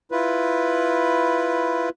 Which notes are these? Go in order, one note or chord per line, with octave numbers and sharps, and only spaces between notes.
E4 F4 B4